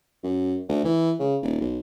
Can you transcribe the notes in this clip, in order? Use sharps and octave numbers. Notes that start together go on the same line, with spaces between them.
F#2
D2
E3
C#3
D#1
B1